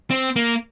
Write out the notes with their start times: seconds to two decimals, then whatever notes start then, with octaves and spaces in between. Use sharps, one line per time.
0.11 C4
0.36 A#3